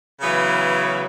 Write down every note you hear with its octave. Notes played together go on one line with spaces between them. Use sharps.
C#3 E3 F#3 B3